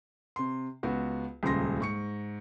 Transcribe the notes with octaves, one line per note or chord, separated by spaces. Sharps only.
C3 C6
C#2 B3 F#4
D#1 C#2 C#3 C6 A#6
G#2 C#6 C#7